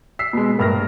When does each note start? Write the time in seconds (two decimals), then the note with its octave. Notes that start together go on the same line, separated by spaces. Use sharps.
0.19 E6 B6 C7
0.33 B2 G#3
0.58 A#1 G2 A#4 F6 A#6